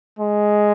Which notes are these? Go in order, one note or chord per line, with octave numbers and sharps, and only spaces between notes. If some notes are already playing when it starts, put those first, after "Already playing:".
G#3